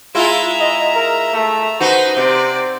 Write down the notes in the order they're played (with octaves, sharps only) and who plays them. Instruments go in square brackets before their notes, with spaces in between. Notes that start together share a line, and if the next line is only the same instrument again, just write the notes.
[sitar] G#3 E4 F4 [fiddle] E5 A#5
[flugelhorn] D#5
A#4
A3
[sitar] D#4 F#4 [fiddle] B4 [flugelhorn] C5
[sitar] C3 [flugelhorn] C5 [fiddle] D5